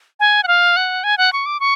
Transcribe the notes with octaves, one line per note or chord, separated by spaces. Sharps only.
G#5
F#5
F5
F#5
G#5
F#5
C#6
D6
C#6